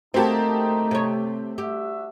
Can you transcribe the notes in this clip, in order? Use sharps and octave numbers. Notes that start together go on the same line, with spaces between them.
A3 A#3 C4 D#4 F#4 G4 A5
C3 C#5
D4 F#4 G4 E5